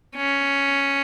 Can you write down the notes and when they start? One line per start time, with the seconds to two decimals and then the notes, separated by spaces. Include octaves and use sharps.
0.15 C#4